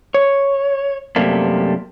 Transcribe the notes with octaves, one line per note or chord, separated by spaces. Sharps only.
C#5
F#2 C3 G3 A3 A#3